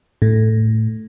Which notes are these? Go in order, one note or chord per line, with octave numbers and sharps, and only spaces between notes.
A2